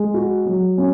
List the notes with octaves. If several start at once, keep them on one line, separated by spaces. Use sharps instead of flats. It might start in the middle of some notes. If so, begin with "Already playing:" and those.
Already playing: G#3
F#4
F#3
C#4